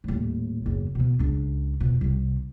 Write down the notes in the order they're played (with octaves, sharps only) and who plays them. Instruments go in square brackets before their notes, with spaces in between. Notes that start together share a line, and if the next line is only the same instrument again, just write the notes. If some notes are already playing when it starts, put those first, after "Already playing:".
[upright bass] D#1 A2
F#1 E2
B2 B3
C#2 D4
F2 B2
C2 C3